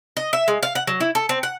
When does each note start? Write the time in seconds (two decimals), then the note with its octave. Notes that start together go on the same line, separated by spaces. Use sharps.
0.17 D#5
0.33 E5
0.48 G#3
0.63 F5
0.75 F#5
0.87 F#3
1.00 E4
1.15 A4
1.29 C4
1.43 F#5